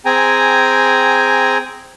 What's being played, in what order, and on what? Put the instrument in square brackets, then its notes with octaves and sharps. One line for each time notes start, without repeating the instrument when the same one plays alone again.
[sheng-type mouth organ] C4 G#4 G5 G#5 A#5